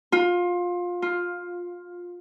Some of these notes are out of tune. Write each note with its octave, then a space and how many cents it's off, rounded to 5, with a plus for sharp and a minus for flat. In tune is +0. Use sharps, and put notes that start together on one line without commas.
F4 +20
F4 +10